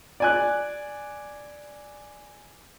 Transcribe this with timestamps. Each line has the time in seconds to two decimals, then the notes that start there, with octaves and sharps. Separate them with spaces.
0.20 D5 G#5 F#6